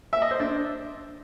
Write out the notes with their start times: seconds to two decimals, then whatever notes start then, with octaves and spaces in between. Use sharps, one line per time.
0.13 E5
0.22 D#5
0.31 C5
0.40 D4